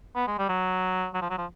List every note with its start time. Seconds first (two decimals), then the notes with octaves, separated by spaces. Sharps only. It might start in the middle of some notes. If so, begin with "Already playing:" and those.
0.16 B3
0.27 G#3
0.38 G3
0.49 F#3
1.14 F#3
1.22 F3
1.30 F#3
1.38 F3